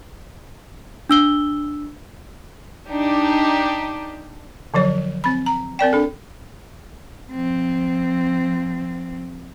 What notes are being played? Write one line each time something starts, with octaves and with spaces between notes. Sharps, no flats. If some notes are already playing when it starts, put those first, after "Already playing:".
D4 E6 G7
D4 D#4 G4
D3 F3 F#3 C#5
C4 B5
A#5
C4 A#4 D5 G5
D4 A4
F3 C4